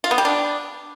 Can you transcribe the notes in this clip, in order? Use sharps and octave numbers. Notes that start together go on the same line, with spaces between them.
F4
B3
G3
D4